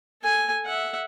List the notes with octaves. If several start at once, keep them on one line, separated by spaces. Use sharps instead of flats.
A4 G#5
E5 F#5